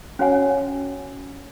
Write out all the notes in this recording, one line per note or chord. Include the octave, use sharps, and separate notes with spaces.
C#4 F#4 C#5 F#5 G#5